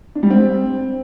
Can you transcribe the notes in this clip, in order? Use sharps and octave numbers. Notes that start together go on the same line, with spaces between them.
D4
G3
C4